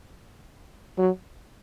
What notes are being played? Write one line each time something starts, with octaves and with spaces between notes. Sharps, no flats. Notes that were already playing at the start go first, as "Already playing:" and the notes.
F#3